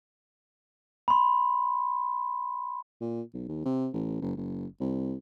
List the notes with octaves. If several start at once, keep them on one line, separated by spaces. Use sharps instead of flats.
B5 C6
A#2
B1
D#2
C3
A1
F#1
F#1
C2